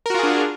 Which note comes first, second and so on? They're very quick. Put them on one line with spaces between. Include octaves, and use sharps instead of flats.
A#4 F#4 F4 G#4 D4